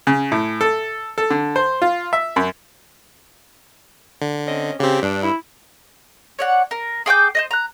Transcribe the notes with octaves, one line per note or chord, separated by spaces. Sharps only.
C#3
A2
A4
A4
D3
C5
F4
E5
F#2
D3
C4 C#4 D#5
C#3 C4 G4
G2 D4
E4
C#5 D5 F#5
A#4
G#4 G5 D6 G6
C5 D5 D#5
A#5 F#6